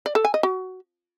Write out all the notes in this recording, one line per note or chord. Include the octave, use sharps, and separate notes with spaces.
D5
A4
G#5
D#5
F#4